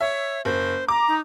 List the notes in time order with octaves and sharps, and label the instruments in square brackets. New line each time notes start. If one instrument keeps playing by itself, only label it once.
[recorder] C#5 [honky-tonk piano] E5
[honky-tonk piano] F#1 [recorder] C5
[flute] A#5 [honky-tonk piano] D6
[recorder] D#4